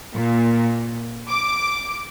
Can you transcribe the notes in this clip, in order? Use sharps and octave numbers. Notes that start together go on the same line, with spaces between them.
A#2
D6